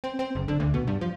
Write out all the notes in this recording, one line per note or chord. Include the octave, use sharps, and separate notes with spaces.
C4
C4
F#1
D3
D2
B2
G2
F3